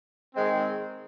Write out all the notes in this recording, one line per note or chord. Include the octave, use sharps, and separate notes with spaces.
D#3 G#3 C4